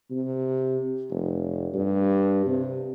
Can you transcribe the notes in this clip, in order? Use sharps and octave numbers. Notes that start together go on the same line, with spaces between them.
C3
F1
G2
C3